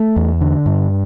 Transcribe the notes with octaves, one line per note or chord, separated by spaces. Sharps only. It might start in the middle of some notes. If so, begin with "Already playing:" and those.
Already playing: A3
E2
D3
G2